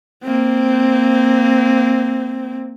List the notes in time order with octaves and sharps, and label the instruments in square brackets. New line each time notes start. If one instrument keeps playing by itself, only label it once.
[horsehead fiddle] A#3 C4